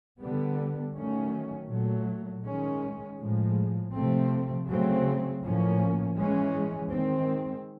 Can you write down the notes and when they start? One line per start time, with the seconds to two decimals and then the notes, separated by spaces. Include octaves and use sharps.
0.18 D3 G3 B3
0.94 D#3 F#3 A3 C#4
1.69 A#2 F#3 A3
2.43 D#3 G#3 C#4
3.17 A2 F3 G#3
3.93 C3 F3 A3 C4
4.67 C#3 F#3 A3 C4
5.42 A2 F3 A#3 C#4
6.16 E3 G#3 C#4
6.91 D#3 G#3 C4